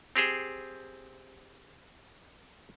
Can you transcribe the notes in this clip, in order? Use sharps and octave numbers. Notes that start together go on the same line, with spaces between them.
C4 G4 G#4 C5